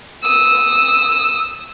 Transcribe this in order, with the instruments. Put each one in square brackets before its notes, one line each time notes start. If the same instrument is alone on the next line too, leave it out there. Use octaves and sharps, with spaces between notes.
[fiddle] D#6 E6